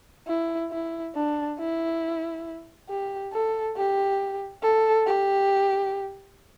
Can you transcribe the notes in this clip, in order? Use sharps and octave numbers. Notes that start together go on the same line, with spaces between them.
E4
E4
D4
E4
G4
A4
G4
A4
G4